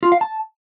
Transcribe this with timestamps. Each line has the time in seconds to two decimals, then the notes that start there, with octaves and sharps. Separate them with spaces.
0.03 F4
0.12 F5
0.21 A5